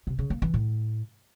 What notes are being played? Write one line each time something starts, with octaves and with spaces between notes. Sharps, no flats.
C3
C#3
A#3
E3
A2